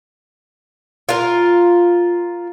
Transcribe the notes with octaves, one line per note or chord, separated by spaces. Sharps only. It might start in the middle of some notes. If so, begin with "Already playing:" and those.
F4 A#4